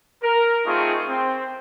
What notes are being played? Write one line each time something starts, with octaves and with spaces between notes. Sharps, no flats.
A#4
A3 C4 D#4 F4 G#4 C#6
C4